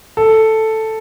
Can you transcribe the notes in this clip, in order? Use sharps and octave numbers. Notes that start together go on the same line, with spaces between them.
A4